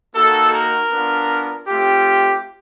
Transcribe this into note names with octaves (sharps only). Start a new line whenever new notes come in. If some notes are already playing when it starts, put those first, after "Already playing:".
A#3 D#4 F#4 A4
A#4
B3 D4 F4
A3 C4 F4 G4